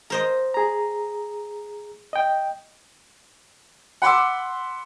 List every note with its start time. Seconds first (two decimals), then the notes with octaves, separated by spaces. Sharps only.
0.10 A#4 C5 D#5
0.54 G#4 A#5
2.13 D#5 G5
4.02 F#5 B5 C6 D6 E6